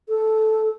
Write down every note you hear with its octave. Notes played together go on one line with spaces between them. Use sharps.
A4